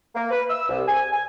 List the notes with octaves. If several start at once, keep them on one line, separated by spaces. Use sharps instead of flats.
A#3
B4
E6
C2
G#5
G#5